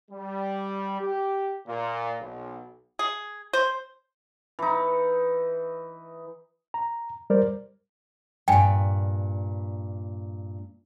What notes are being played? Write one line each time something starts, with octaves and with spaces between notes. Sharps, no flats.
G3
G4
A#2
B1
G#4
C5
E3 D#4
A#5
G3 A#4 C5 D5
G2 A#2 G5 G#5